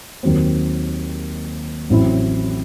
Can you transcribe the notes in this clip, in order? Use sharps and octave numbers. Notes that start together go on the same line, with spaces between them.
D#2 D#3 F#3 C4
A1 A2 F#3 C4 E4